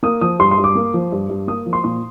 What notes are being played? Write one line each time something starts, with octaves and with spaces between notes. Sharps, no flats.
A#3 D#6
F3 D#6
G2 C6
C6
G2
D6
A#3
F3
G2
G2
A#3 D#6
F3
C6
A#2 C6